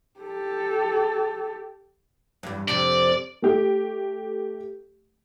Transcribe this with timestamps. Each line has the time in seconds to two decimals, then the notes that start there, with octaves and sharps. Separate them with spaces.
0.20 G4 A4
2.43 E2 G2
2.68 F2 C3 D5
3.42 A3 G4